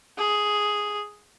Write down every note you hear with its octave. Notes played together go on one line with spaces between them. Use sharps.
G#4